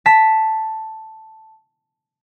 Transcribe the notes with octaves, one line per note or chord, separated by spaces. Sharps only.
A5 B6